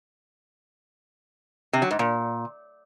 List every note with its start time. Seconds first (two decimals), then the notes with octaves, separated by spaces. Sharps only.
1.73 C3
1.82 F#3
1.91 G#2
1.99 A#2